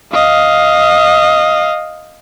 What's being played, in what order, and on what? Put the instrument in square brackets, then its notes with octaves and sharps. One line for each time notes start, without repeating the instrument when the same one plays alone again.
[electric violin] D#5 F5